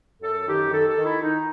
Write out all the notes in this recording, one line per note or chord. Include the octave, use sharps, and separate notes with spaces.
F#2 A4
D#3 G4
D#3 A4
A4
D#3
E4
D#3 D#4